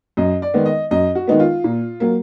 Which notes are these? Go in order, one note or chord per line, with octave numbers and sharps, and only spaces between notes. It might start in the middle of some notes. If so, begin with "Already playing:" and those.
F#2 D#5
D5
D#3 G#3 B3
D#5
F#2 D#5
F#4
D#3 G#3 B3 D#4
F4
A#2
F#3 A#3